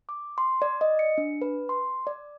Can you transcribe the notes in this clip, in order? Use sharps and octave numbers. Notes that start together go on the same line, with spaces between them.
D6
C6
D5
D#5
C#7
D4
B4
C6
D5